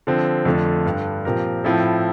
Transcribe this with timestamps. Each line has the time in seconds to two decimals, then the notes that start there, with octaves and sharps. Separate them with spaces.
0.07 D3 F3 C4
0.45 F2 D3 A3 D4 F4
0.86 G2 D3 G3
1.25 A#2 F3 C4 G4 A#4
1.64 A2 F3 C4 E4 A4